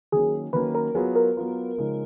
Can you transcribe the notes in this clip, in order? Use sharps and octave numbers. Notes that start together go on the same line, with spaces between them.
D#3 F#3 A#3 C#4 G#4
D#3 F#3 A#3 C#4 B4
A#4
F#3 B3 F4 G#4 B4
A#4
F#3 B3 F4 B4
C#3 F3 G#3 D#4